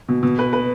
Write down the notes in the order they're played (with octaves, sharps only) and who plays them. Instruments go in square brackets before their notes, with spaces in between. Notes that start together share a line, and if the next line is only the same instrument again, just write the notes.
[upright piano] B2
B2
B4
B4